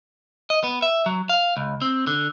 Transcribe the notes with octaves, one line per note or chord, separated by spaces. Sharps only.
D#5
B3
E5
F#3
F5
C#2
C4
D3